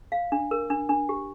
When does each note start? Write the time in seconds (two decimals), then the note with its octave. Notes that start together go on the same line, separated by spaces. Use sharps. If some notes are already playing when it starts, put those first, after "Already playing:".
0.12 F5
0.32 D4
0.51 A#4
0.70 D4
0.89 D4
1.09 G4